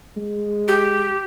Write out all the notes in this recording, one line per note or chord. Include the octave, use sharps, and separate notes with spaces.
G#3
G4